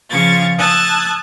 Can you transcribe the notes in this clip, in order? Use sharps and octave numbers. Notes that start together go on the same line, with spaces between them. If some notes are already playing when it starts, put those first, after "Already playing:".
C#3 F3 F4 C#6 G#6 A6
A5 D#6 E6 F#6 G#6 A6